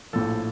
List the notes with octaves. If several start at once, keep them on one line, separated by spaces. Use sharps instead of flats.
A#1 A2 F3 A4